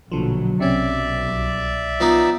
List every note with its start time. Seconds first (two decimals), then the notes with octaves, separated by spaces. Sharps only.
0.12 A#1 B2 D3 F3 F#3
0.60 B1 C3 C#4 D5 E5
1.28 C2
2.00 F3 B3 D#4